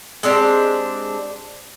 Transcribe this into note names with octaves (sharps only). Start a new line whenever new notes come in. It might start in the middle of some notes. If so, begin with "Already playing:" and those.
G#3 C4 D4 G4